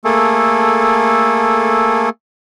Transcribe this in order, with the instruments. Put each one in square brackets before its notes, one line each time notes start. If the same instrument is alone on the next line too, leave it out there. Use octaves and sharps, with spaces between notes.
[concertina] A3 A#3 G#4 A4